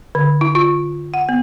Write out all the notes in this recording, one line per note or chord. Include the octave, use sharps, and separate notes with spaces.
D3
E4
F4
F#5
B3